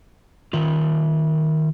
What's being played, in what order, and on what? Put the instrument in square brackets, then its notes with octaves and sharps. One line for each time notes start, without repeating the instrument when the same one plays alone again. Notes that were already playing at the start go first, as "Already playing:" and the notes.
[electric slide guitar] D#3 F4